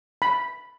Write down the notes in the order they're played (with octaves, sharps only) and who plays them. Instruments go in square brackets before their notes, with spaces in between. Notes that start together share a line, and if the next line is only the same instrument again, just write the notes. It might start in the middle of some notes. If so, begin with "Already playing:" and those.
[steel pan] B5